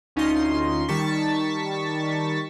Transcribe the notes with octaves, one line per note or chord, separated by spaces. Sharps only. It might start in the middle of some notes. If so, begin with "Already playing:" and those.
D2 C#4 D#4 F4 D#5 C6
D#3 G3 A5 C#6 A6 B6